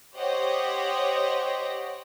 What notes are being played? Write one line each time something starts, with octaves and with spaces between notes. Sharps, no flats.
G4 C5 C#5 D#5 F#5 G5